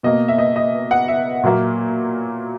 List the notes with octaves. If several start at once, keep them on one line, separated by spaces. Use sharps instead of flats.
B2 A#3 D#5
E5
D#5
D#5
F#5
E5
A#2 F#3 A#3